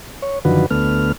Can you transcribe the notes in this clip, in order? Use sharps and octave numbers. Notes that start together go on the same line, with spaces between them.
C#5
F#2 D3 D#3 F3 F#4 B4
D2 A3 B3 F6